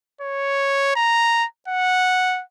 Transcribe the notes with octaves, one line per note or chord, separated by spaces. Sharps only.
C#5
A#5
F#5